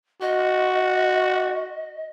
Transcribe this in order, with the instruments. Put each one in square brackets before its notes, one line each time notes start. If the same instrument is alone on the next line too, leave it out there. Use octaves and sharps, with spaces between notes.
[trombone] F#4 [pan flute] D#5